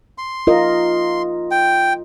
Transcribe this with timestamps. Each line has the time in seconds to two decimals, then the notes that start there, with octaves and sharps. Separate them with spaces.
0.18 C6
0.47 F4 A#4 D#5
1.51 G5